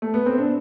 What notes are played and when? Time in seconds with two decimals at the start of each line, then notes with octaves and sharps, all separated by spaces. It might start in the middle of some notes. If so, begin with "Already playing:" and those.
0.02 A3
0.14 B3
0.26 C4
0.38 D4